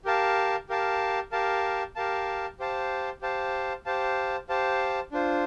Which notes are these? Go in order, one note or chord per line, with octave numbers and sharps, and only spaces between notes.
G4 A#4 F5 A5
G4 A#4 F5 A5
G4 A#4 F5 A5
G4 A#4 F5 A5
G4 C5 F5 A5
G4 C5 F5 A5
G4 C5 F5 A5
G4 C5 F5 A5
D4 F4 C5